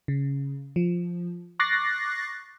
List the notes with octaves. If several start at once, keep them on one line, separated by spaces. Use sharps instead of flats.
C#3
F3
C#6 D6 F#6 A6 A#6 C7